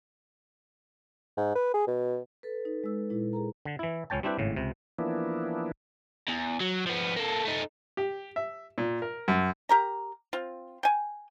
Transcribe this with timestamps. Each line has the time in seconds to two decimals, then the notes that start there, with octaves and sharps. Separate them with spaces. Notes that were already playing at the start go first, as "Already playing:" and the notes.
1.37 G#2
1.55 B4
1.74 G#4
1.87 B2
2.43 A4 B4
2.65 D#4
2.84 G#3 E6
3.10 A#2 G#3 E4
3.33 G#4 A#4 A#5
3.65 D3
3.79 E3 E4
4.10 C#2 C#4 C#5 G5 A5
4.23 G3 C4 D4 E4 G4 B4
4.39 G#1 A2 C#3
4.56 C#2 C3
4.99 E3 F3 A#3 B3 D4 E4
6.28 E2
6.60 F#3
6.86 F3 B3
7.16 A#3 A4
7.45 A3 D#4
7.97 G4
8.36 E5
8.78 A#2
9.02 A#4
9.28 F#2
9.69 G4 A#4 A#5
10.33 C4 F4
10.83 G5 G#5